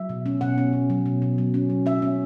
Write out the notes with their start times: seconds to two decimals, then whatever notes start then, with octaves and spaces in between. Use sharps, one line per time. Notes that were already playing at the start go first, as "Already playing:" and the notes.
Already playing: F#3 E5
0.09 B2
0.26 C#4
0.41 B2 F#5
0.58 C#4
0.73 B2
0.90 F#3
1.06 B2
1.22 B2
1.38 F#3
1.54 C#4
1.70 F#3
1.86 C#4 E5
2.02 C#4